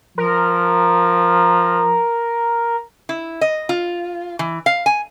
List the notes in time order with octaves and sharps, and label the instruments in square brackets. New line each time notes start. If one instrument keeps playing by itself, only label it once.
[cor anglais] F3 [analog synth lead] A#4
[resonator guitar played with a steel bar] E4
D#5
F4
E3
F5
G#5